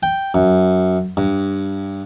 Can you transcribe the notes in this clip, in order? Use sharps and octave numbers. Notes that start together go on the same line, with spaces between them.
G5
F#2
G2